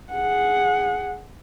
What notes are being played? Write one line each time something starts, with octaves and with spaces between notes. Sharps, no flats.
G#4 F#5